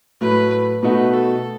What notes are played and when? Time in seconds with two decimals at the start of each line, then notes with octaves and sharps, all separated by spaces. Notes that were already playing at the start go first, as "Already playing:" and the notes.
0.21 A2 F#3 A3 B4
0.82 B2 A3 D#4 F#4 B4
1.13 A4